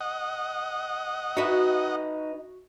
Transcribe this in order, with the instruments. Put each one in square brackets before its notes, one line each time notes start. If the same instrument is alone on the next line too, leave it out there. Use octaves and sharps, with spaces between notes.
[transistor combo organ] D#5 F#5
[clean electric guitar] D#4 B4 [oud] F#4 E5